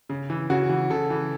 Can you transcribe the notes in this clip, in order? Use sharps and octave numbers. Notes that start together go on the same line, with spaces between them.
C#3
E3
C#3 F#4
E3
C#3 A4
E3